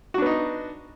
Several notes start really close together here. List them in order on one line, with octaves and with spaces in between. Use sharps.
F#4 D4 B3 D#4